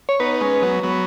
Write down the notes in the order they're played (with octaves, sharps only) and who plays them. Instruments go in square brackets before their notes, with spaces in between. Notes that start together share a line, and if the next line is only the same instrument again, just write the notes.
[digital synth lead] C#5
[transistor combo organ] B3 D#4 [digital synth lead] B4
[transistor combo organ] G#3 C#4
F#3 B3
F#3 B3